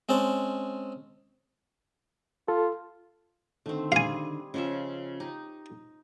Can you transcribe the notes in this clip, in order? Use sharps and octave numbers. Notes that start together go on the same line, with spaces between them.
G#3 C4 C#4 A5
F4 A4
D3 D#3 A3 C4 D#4
G3 G#4 F5 G#5
C#3 F3 C#4 G4 D#5 E5
D#4 G4